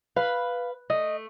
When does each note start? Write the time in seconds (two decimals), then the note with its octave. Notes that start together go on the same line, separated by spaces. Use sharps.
0.17 B4 F5
0.90 A3 D#5